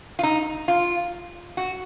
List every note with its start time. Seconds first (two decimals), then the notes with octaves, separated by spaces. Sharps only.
0.19 F4
0.23 D#4
0.68 F4
1.57 F#4